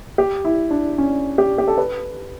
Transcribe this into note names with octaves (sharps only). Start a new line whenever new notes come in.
G4
E4
D4
C#4
G4
G4
A4
B4